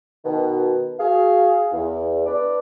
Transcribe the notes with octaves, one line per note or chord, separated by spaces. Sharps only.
B2 D#3
F#4 G#4 F5
E2
D4 B4 D5